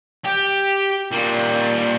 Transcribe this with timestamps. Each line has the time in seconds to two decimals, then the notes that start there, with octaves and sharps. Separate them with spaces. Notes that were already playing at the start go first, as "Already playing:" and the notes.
0.25 G4
1.11 A#2 G3